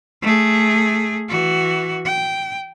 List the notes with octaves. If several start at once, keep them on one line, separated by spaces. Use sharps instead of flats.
A3 G#4
E3 F#4
G5